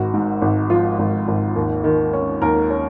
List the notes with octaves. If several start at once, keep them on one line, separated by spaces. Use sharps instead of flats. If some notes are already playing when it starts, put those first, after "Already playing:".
Already playing: G#1 F#4
G#2
G#1
F3 F4
G#1
G#1
D#2
D#3
C#4
D#2 A#4
C#4